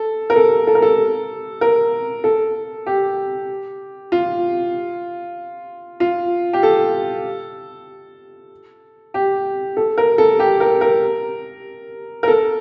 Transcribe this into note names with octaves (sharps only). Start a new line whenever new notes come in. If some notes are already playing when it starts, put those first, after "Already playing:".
Already playing: A4
A#4
A4
A4
A#4
A4
A#4
A4
G4
F4
F4
G4
A4
G4
A4
A#4
A4
G4
A#4
A#4
A#4
A4